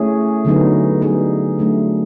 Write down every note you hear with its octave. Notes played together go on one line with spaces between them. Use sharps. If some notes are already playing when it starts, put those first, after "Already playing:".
Already playing: A3 C#4 E4 G#4
D3 F#3 B3 D#4
G3 B3 D#4 G#4
F#3 A3 D4